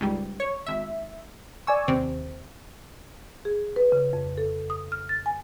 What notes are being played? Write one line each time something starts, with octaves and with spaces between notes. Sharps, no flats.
C#2 G#2 G3
C#5
G#1 E5
D5 G#5 C#6 E6
D#2 C3 C4
G#4
B4
C#3
F2
A4
D#6
F6
A6
G#5